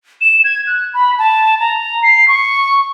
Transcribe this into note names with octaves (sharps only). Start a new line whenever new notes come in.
E7
G#6
F#6
B5
A5
A#5
C7
C#6